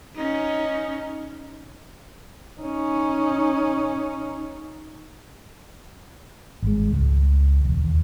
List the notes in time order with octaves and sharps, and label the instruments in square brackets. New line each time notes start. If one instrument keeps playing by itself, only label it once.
[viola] C#4 D#4
[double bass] C#4 D#4
[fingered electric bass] G#1 G#3
C#2
E1
D#2